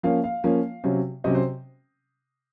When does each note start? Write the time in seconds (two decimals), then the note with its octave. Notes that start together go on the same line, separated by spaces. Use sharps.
0.03 F3 A#3 C#4 F5
0.24 F5
0.44 F3 A#3 C#4
0.84 C3 F#3 C#4
1.24 C3 F#3 C#4 D#5
1.35 C5